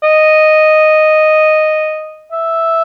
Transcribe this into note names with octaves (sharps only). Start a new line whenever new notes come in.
D#5
E5